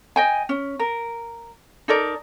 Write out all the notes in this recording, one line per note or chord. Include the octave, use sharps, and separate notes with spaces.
D#5 G5 G#5
C#4
A#4
D#4 A4 A#4 D5